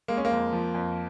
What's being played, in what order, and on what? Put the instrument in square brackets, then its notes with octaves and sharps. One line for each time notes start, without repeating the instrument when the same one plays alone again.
[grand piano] G#3 A#3
C#4
A#3
F2
F3
F2